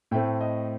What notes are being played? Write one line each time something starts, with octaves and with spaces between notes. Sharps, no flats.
A2 A3 C4 G5
D#5